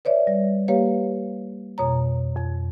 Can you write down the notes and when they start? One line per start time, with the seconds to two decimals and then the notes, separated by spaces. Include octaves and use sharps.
0.05 B4 C#5 D5 E5
0.27 G3
0.68 A#3 G4 B4 C#5 F5
1.78 F2 B2 C#5 A#5
2.37 F2